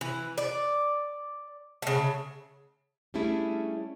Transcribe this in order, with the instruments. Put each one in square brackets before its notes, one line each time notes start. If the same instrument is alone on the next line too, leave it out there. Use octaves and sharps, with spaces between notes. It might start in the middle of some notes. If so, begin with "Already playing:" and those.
[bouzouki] E3
D5
C#3 A3
[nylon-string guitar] G3 A3 C#4 D4 E4 G#4